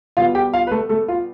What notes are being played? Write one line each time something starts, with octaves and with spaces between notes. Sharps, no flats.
B2 G3 B3 F4 F5
G4 G5
F4 F5
B4
A3 A4
A3 A4
F4